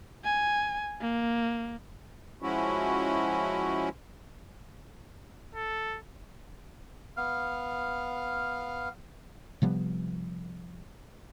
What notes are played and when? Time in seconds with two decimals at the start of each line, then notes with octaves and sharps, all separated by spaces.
0.25 G#5
1.01 A#3
2.42 F3 G#3 C#4 E4 F#4
5.54 A4
7.17 B3 F5 F6
9.62 C3 F3 G3 B3